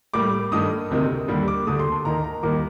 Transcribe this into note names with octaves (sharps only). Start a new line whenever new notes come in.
A2 G3 A#3 D6
G2 D#3 A3 D#6
D2 C3 D#3 A#3
D#2 D3 G3 A#3
D6
D2 D3 A3 D#6
C6
A5
D#2 D#3 A#3 A#5
A#5
D#2 D#3 G3 A#3 D6